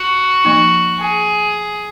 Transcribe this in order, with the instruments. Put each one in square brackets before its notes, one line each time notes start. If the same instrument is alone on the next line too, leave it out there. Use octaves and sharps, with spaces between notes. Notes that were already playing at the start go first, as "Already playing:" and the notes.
Already playing: [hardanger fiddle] F#4
[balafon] F3 A#3 D#4
[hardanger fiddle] G#4